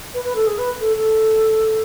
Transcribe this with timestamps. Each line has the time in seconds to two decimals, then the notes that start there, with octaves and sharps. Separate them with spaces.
0.14 B4
0.24 B4
0.35 A4
0.47 G#4
0.58 B4
0.80 A4
0.96 A4